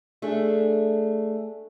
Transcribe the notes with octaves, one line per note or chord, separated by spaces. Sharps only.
A3 D4 G#4